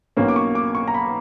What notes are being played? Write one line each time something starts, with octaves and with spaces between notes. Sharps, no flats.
B1 B2 A#3 C#4
D6
C#6
D6
C#6
A#5
B5